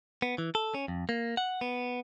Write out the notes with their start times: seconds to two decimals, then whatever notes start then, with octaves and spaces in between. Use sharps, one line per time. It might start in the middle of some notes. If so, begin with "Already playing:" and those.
0.22 B3
0.38 E3
0.55 A4
0.74 C#4
0.88 F2
1.09 A#3
1.37 F#5
1.61 B3